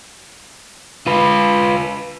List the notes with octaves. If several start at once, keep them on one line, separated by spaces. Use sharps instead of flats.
F4 B4